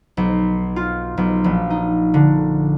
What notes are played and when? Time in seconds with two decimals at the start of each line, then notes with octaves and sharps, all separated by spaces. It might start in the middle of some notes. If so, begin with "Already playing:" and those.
0.17 B1
0.76 F4
1.17 B1
1.44 A#1
1.70 D#4
2.14 D3